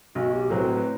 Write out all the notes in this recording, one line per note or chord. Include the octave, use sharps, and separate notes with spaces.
B1 F#4
G4
A2 F#3 C4 B4
B4